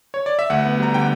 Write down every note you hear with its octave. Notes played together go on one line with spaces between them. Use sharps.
C#5
D5
E5
D2 F#5
B3
G3 A#5
D3 G5